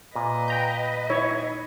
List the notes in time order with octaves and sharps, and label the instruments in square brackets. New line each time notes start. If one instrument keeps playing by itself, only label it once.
[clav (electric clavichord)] A#2 [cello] B4 D#5
[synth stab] G5 A#5 G6
[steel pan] D#4 C#5 [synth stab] E4